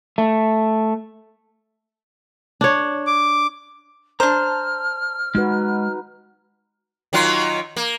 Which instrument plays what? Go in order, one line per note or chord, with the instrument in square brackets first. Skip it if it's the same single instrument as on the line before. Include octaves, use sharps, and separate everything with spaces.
[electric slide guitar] A3
[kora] D4 C#5
[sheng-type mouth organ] D6
[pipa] D4 C5 [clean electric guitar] A5 A#5 [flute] F6
[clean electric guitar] G#3 [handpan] D#4 F#4 B4
[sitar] D#3 F#3 F4
A#3